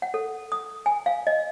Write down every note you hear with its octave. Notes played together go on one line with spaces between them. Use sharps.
F#5
A4
D#6
G#5
F5
D#5